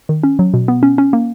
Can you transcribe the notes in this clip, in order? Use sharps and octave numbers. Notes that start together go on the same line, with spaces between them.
D#3
C#4
F#3
B2
B3
C#4
C#4
A#3